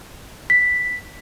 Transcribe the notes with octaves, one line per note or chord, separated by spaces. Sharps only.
B6